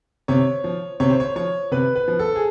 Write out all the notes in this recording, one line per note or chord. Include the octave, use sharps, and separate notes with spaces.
C3 C#5
F3
C3 C#5
C5
C#5
F3 C#5
C3 B4
B4
F3
A4
G#4